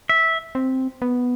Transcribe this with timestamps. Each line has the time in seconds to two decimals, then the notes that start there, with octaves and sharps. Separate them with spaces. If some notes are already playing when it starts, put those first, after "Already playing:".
0.09 E5
0.55 C4
1.02 B3